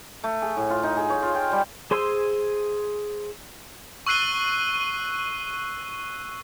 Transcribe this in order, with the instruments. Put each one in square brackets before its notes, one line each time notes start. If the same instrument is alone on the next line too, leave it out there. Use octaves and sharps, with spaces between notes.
[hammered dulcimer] A3
G#4
A2
F4
D#4
G#4
C#5
F4
G5
G3
[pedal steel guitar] G#4 C5 G#5 C6 E6
[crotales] C#6 E6 F#6 C7 D#7 G7